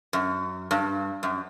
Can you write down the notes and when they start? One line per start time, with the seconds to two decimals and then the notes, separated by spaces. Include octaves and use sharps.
0.13 F#2
0.71 G2
1.23 F#2